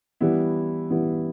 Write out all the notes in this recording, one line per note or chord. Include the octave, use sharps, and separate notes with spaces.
E3 G3 B3 E4
E3 G3 B3 E4